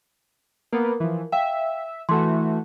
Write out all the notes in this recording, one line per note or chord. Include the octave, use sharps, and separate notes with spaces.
A#3 B3 A#4
E3 F3
E5 F5 G5
E3 A3 F#4 C6